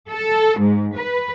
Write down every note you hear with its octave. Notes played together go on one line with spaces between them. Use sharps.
A4
G#2
B4